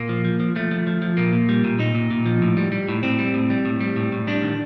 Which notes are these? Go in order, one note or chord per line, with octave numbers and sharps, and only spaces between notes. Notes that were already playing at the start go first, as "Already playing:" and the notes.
Already playing: A#2 A#3
F3
F3
F3
F3 A3
F3
F3
F3
A#2 A#3
A#2
G3
A#2
A#2 D#4
A#2
A#2
F3
A2
G3
G3
A2
A2 C4
G3
A2
G3
A2
G3
A2
A2
G3 D4
D#3